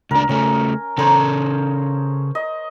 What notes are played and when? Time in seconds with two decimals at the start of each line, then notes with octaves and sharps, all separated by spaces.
0.11 C#2 D4 A#4
0.29 C#3 A3 C#4
0.98 C#3 A4 C5 C#5 A#5
2.35 D#5